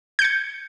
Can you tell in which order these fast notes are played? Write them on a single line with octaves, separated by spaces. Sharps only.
G6 C#7 G#6